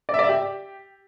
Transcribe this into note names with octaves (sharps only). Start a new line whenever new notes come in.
D5
E5
D5
E5
G4